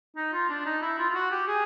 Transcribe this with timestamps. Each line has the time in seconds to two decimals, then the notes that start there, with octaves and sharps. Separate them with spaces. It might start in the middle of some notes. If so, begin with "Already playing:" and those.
0.16 D#4
0.33 F4
0.49 D4
0.66 D#4
0.82 E4
0.99 F4
1.10 F4
1.14 F#4
1.31 G4
1.47 G#4